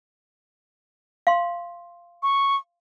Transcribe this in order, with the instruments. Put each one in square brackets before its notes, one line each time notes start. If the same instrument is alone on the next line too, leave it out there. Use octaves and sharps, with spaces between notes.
[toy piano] F5 C6
[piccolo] C#6